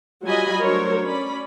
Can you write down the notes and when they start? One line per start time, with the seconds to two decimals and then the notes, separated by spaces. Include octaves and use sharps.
0.24 F#3 G3 F4 D#5 G#5 B5
0.63 F#3 A3 D4 A#4 C5 C#5
1.05 C#4 D5 B5